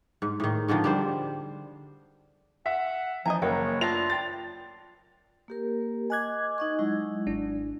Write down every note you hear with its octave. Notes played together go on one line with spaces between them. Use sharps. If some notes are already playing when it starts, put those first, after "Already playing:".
G#2
A2 D#3
G#2 D3 D#3 F3
G3 D4 C5
E5 F#5
E3 F3 D#5 G#5 A#5
F#1 E3 A#3 C#5 F#5 G5
A3 B3 D4 F4 A#6 F7
G5 A6
A#3 G4 A#4
D#5 G#5 D6 F#6 G#6
D#4 D#5 C#6
F#3 G#3 E4
G#1 D4